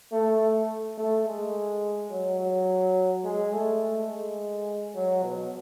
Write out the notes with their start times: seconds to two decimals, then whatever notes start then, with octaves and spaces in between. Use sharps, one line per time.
0.12 A3
0.98 A3
1.26 G#3
2.10 F#3
2.39 F#3
3.24 G#3
3.53 A3
4.09 G#3
4.95 F#3
5.23 B2